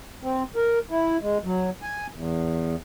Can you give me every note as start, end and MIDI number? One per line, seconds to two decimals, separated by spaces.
0.23 0.43 60
0.56 0.79 70
0.91 1.17 64
1.21 1.38 56
1.44 1.70 54
1.82 2.07 80
2.14 2.76 40